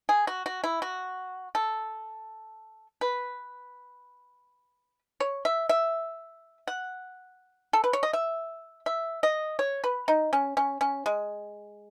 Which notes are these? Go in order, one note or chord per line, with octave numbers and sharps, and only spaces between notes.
G#4
F#4
F#4
E4
F#4
A4
B4
C#5
E5
E5
F#5
A4
B4
C#5
D#5
E5
E5
D#5
C#5
B4
D#4
C#4
C#4
C#4
G#3